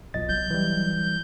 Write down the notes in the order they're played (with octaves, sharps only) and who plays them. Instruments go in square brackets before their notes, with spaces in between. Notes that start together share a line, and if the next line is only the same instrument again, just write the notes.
[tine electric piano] B1 D#5 A6 [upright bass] F2
[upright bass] F#3 [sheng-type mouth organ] G6
[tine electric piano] E3 G3